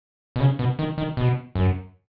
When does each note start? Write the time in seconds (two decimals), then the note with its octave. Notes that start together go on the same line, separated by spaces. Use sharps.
0.36 B2
0.40 C#3
0.59 B2
0.79 D#3
0.98 D#3
1.17 B2
1.55 F#2